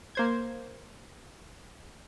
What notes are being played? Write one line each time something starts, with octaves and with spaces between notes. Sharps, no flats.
A#3 C5 G#6